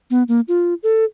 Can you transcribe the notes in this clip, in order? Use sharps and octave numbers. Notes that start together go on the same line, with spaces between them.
B3
A#3
F4
A4